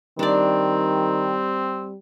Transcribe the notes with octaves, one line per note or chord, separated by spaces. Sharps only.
D#3 G3 C4 D4 D5